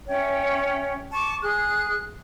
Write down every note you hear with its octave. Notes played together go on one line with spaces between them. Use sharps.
C#4 C#5 E5 G5
A5 C#6 D6
G#4 F#6